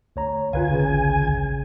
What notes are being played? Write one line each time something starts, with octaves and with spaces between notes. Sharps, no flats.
D2 C#5 A#5
D2 F4 B4 F5 G#5
A1 C#3